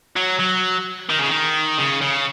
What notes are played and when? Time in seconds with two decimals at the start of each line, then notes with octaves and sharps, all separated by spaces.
0.16 F#3
0.39 F#3
1.09 D#3
1.18 C#3
1.28 D#3
1.78 C#3
2.02 C#3